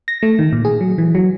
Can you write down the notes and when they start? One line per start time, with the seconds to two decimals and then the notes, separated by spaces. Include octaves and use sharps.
0.08 A#6
0.23 A3
0.39 D#3
0.53 A#2
0.65 G#4
0.81 F#3
0.98 E3
1.15 F#3